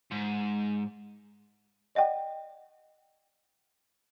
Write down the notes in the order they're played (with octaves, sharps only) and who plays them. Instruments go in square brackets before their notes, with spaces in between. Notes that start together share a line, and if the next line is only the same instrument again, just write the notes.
[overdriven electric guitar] G#2
[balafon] D5 D#5 F#5 G5